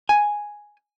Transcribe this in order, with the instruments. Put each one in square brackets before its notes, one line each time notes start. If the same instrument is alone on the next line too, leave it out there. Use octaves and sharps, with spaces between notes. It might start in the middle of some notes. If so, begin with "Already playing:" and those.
[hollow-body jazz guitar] G#5